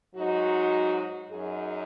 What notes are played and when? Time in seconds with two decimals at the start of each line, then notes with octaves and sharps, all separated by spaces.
0.16 G#2 F#3 D#4 F#4
1.29 F#2 F#3 D#4 G#4